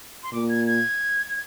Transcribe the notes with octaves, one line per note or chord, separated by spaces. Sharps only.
C6
A#2 D6
G#6
G#6